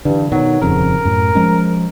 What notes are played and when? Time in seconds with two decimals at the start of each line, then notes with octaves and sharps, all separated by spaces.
0.05 G2 D3 E3
0.32 B2 D#3 F#3
0.62 D#1 F2 C#3 A#4
1.05 F#2 A2
1.35 F3 G#3 C#4